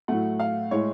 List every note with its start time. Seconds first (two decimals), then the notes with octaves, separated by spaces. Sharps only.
0.08 A2 F#3 A3 F#5
0.40 F5
0.71 A2 G#3 C#5